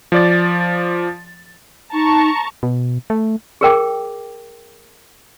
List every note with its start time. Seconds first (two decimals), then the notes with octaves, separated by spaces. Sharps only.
0.12 F3 D5 A6
1.93 D#4 A5 A#5 C#6
2.63 B2
3.10 A3
3.61 G#4 A#4 G5 D6